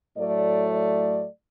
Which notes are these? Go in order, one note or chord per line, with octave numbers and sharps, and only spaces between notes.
A2 F#3 A3 D5
D5